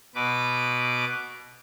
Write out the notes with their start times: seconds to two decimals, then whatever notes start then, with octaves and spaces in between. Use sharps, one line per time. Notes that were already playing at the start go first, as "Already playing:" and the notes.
0.15 B2 B4 D6